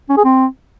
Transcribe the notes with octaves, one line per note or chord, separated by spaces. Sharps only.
C#4
G#4
C4